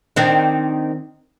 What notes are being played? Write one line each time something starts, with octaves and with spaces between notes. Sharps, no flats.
D#3 C4 D4